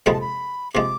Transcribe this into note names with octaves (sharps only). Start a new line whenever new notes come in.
F2 C3 F3 G#3 B5
A5
B5
C3 F3 G#3 D6